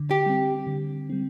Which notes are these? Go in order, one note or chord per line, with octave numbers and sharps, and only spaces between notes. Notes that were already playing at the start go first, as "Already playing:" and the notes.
Already playing: D3
G4
G3 C4
D3
G3 C4